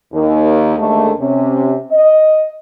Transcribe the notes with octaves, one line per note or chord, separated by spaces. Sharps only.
D#2
D#2 D3 G#3 A3
C3 C#4
D#5